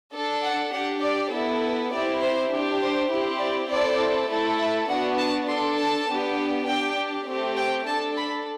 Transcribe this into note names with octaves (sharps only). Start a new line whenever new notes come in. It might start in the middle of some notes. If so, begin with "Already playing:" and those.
D4 A4
F#5
D4 G4 F#5
D5
B3 E4 A4
C4 E4 G4 D5
C5
D4 G4
C5
C4 E4 G4
D5
C4 E4 A4 D5
A3 E4 A4
E5
B3 D4 F#4 F#5
A5
D4 A4 C6
A5
B3 D4 G4
D4 G4 G5
A3 C4 G4
G5
D4 A4 A5
B5